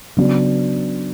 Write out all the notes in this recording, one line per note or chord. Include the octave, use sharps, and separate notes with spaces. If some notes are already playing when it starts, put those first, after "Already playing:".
C#3 F#3 B3 D4